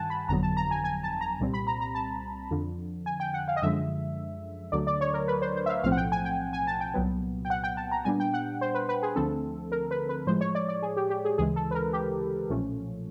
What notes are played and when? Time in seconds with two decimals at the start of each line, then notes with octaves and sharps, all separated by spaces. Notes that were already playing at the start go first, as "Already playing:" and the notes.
Already playing: G2 D#3 G3 F#5 G#5 A5
0.10 B5
0.29 G1 F2 D3 F#3 B3 A#5
0.43 A5
0.57 A#5
0.71 G#5
0.84 G#5
1.03 A5
1.21 A#5
1.40 C2 A#2 G3 C4
1.54 B5
1.67 A#5
1.81 A#5
1.95 A5
2.51 F2 D3 F3
3.06 G#5
3.20 G5
3.34 F#5
3.48 F5
3.56 D#5
3.62 F#2 D3 F3 G#3 E5
4.72 D2 D3 F#3 A3 D5
4.87 D5
5.01 C#5
5.14 A#4
5.28 B4
5.42 C5
5.56 C5
5.66 E5
5.69 F5
5.83 B1 A2 F3 A3 C4 F5
5.92 F#5
5.97 G5
6.12 G#5
6.25 G5
6.53 G#5
6.67 A5
6.80 G5
6.94 C2 A#2 F#3 B3
7.45 G5
7.50 F#5
7.64 G5
7.77 A5
7.91 A#5
8.05 A#2 G3 B3 D4 G#5
8.20 G5
8.34 F#5
8.61 C5
8.75 B4
8.89 B4
9.03 G#4
9.16 D2 D3 F3 A3 C4 A4
9.72 A#4
9.91 B4
10.09 B4
10.27 A2 F3 G#3 C5
10.41 C#5
10.55 D5
10.69 D5
10.82 G#4
10.97 G4
11.10 G4
11.25 G#4
11.38 D2 C#3 E3 G#3 G#4
11.56 A4
11.71 B4
11.75 A#4
11.93 G4
12.49 B1 A#2 F3 A3 C#4